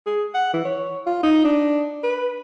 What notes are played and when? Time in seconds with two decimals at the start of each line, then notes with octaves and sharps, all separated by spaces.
0.06 G#4
0.34 F#5
0.53 E3
0.65 C#5
1.07 F4
1.23 D#4
1.45 D4
2.04 B4